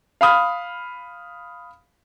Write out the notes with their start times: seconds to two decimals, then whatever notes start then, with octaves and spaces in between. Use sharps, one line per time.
0.21 F5 B5 D#6 F6